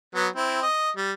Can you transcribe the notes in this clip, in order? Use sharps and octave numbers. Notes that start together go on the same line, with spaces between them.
F#3 B3
C4 E4
D#5
G3